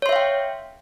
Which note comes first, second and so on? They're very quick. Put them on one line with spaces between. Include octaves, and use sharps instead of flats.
C#5 C6 E5 F5 G5